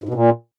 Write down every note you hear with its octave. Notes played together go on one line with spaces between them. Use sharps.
G#2
B2
A#2